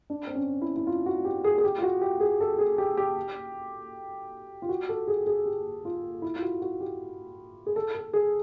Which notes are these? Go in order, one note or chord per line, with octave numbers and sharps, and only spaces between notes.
D4
C4
C#4
E4
E4
F4
F#4
G4
G#4
G#4
G4
F4
F#4
G4
G#4
A4
G#4
G4
G4
F4
F#4
A4
G#4
G#4
G4
F4
E4
F4
F#4
F#4
G4
G#4
A4
A4
G#4